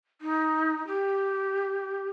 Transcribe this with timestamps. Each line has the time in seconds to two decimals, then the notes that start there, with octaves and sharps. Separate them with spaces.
0.22 D#4
0.87 G4